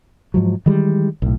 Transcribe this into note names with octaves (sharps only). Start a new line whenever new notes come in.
G#2 F3 F#3
D#3 E3 G3 G#3
B1 A2